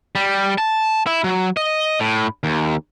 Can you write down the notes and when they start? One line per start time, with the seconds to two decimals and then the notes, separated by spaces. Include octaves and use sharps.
0.15 G3
0.58 A5
1.07 E4
1.24 F#3
1.57 D#5
2.00 A2
2.44 D#2